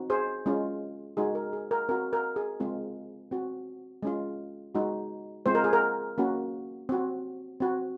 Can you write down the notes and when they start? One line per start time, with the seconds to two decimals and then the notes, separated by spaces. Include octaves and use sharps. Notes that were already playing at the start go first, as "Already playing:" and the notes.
Already playing: C4 D#4 F#4
0.10 G#4 C5
0.46 G#3 C#4 F4
1.17 G#3 D#4 F#4 G#4
1.35 A#4
1.53 G#4
1.71 A#4
1.89 C4 F#4 A#4
2.13 A#4
2.36 G#4
2.60 G#3 C4 F4
3.31 C4 F#4
4.03 G#3 C#4 F4
4.75 G#3 D#4 F#4
5.46 G#3 C4 F4 C5
5.55 A#4
5.64 G#4
5.73 A#4
6.18 A#3 C#4 F#4
6.89 C4 F#4
7.60 C4 F#4